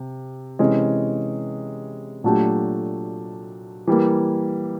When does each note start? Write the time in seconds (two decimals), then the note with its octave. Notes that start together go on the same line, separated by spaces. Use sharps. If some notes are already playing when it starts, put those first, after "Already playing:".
Already playing: C3
0.59 C3 E3 G#3 C#4
2.24 A#2 F#3 A3 D4 G4
3.87 E3 G3 A#3